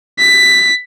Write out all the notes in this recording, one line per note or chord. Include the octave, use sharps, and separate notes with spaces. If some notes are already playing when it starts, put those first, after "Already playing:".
B6